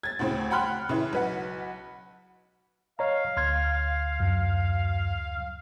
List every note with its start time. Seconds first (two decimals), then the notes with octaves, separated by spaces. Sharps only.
0.03 G#6 A6
0.19 D2 A2 C#3 C4
0.51 F#5 G5 B5 C6 F6 F#6
0.89 C#3 E3
1.13 B1 B4 F#5
2.99 C#5 D#5 F5 A#5
3.37 D2 C6 F6 G#6
4.20 F#2